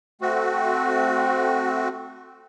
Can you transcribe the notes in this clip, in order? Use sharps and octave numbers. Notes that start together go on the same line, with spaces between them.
A3 C4 F#4